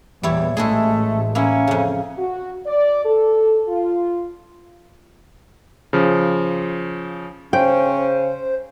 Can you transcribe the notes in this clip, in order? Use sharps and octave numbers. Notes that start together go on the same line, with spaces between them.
E2 A#2 G3 E4 C#5
A1 G#3 A3 E4 G#4
A#3 C#4 E4
F2 C#3
F#4
D5
A4
F4
C#3 F3
C#3 C#4 C5 G5